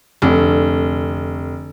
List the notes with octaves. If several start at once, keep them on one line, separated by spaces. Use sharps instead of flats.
F1 D3